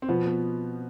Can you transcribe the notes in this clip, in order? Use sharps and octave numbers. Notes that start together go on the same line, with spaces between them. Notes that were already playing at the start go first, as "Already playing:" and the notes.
C4
B2 F3 B3
B3